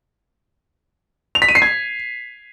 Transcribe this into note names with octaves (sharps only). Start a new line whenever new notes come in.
F7
B6
D#7
C7
G#6